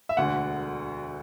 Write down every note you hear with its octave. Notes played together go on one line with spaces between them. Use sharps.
E5
E1 D2 D3 F#5